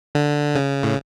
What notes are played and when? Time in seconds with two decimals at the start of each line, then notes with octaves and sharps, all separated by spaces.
0.15 D3
0.55 C#3
0.83 A2